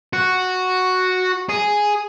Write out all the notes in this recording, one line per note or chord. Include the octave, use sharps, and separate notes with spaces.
F#4
G#4